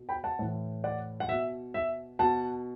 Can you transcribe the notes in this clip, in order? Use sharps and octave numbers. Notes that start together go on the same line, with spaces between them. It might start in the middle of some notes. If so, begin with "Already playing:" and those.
Already playing: B2
G5 B5
F#5 A5
A2 E3
D5 F#5
F#5
B2 E5
E5
B2 F#5 A5